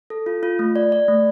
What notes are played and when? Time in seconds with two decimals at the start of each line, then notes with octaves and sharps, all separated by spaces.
0.10 A4
0.26 F4
0.43 F4
0.59 A3
0.76 D5
0.92 D5
1.08 A3